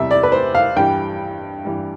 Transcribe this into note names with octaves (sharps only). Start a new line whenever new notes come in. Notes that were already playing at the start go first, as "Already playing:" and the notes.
Already playing: E2 C3 G3 E5
D5
B4
C5
F5
G2 E3 G3 G5
G2 E3 G3